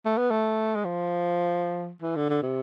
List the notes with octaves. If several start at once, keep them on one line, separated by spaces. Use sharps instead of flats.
A3
B3
A3
G#3
F3
E3
D3
D3
C3